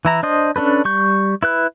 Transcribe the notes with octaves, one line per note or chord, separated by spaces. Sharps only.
E3 E4 A#5
D4 C5 D#5
C#4 D4 A4 B4
G3 C#6 G6
E4 B4 F#6